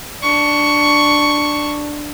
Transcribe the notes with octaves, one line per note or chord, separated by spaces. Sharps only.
D4 C#6